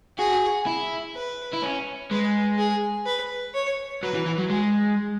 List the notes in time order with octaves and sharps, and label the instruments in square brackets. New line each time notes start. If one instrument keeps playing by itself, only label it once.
[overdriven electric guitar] F#4 [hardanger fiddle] G#4
[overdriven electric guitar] E4
[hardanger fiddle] B4
[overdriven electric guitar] E4
C#4
[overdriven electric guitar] G#3 [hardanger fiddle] B4
[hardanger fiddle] G#4
B4
C#5
[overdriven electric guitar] F#3 [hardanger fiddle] B4
[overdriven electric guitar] E3
E3
F#3
[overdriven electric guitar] G#3 [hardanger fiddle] G#4